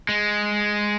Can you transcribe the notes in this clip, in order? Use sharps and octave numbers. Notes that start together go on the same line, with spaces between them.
G#3